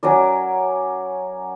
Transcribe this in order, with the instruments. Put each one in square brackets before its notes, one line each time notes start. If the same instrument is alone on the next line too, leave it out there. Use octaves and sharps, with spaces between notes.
[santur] F#3 C#4 A#4 D5